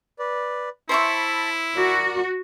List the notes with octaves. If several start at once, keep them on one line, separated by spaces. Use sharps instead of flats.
B4 D5
E4 C5 E5 A5 B5 C#6
F#4 A#4 D5